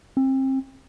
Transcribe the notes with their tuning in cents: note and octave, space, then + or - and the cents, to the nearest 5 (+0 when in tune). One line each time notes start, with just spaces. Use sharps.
C4 +30